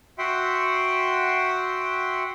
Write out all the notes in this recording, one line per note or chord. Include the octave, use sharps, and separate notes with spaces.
F#4 E5 F#5 G5 C6